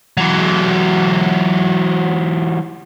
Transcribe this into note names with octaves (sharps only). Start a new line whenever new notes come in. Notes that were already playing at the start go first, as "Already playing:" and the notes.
E3 F#3